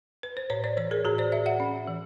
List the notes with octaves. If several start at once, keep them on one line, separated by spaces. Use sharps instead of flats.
B4
C5
A2 B4 C#5
C5 D5
E3 B4 C#5
G#4 A#4
A2 F#4 G#4
C5 D5
A2 D5 E5
E5 F#5
C#4
E3